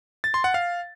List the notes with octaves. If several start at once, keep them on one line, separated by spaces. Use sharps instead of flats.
A6
C6
F#5
F5